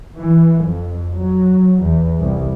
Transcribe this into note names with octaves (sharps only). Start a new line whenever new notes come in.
E3
F2
F#3
E2
C2